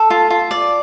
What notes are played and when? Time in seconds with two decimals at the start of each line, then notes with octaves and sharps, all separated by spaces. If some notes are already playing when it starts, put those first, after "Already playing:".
Already playing: A4
0.10 F4
0.30 F4
0.51 D5